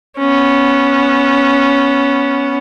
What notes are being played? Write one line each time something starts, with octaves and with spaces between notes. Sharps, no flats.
B3 C#4